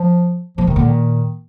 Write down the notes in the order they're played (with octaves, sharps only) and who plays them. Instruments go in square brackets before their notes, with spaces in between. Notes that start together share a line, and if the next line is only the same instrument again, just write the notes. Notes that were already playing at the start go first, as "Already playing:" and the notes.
Already playing: [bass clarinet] F3
[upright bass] A#2 [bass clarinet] F3
[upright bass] C3 [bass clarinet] D#3
[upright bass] A#2 [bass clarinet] D3
[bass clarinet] D#3